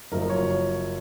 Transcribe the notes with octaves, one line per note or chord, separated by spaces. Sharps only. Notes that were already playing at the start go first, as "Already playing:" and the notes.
F#1 F#2 F3 A#4
C#5